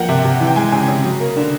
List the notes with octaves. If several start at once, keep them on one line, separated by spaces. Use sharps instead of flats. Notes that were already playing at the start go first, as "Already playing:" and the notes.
Already playing: F3 A#3 F#5 G5
C3 E5
C3
E3
G5
G#3 G#5
C#3 G#5
C#3
F#3
A#3
D3